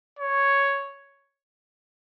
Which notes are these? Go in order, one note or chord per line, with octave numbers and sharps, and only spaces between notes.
C#5